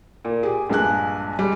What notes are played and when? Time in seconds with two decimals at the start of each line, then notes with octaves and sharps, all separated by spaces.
0.25 A#2
0.43 G4 G#4
0.70 A#1 G2 G#3 G#5 F#6
1.39 G3 G#3